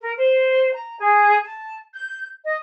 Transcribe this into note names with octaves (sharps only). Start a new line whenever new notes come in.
A#4
C5
A#5
G#4
A5
G6
D#5